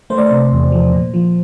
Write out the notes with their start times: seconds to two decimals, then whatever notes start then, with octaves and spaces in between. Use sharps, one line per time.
0.10 A3 C5
0.18 D5
0.26 C3 C5
0.52 E2
0.72 F3
0.93 A#2
1.14 F3